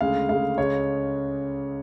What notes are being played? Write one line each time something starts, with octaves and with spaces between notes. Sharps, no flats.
D2 C#3 G#3 F5
D2 C#3 G#3 F5
C#2 C#3 G#3 C#5